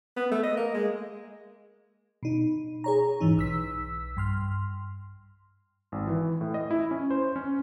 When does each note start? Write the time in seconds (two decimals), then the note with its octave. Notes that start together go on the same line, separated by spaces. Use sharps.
0.17 B3
0.31 A3
0.44 D#5
0.57 A#3
0.74 G#3
2.23 B2 D#4
2.84 G#4 C#5 A#5
3.20 G#2 E3 D#4
3.37 B1 E6 B6
4.17 G2 C6 F6
5.92 G#1
6.07 E3
6.41 A2
6.54 D#5
6.71 E4
6.91 C#4
7.11 C5
7.36 C#4